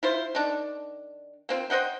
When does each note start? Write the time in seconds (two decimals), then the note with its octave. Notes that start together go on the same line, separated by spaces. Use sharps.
0.03 E4 F4 C5
0.35 D#3 D4
1.49 A#3 C4 F4
1.70 C5 D#5 F#5 G5